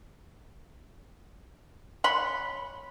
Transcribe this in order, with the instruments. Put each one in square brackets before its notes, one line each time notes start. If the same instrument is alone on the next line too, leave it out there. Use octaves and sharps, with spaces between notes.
[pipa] C#5 F#5 B5 C6